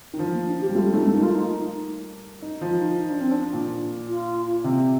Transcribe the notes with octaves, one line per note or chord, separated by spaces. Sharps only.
D#3
F3 D#4
A#3
D4
G4
G3
A3 F4
A3 D#4
A3
A#3 D#4
F4
D#4
D#4
F3
F4
D#4
D#4
D4
C4
D4
A#2
F4
C3